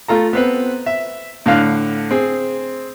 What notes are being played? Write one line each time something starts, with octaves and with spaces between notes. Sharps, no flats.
A3 F4 A4 A#5
B3 C4 B4
E5
A2 D3 F5 F6 F#6
C4 G#4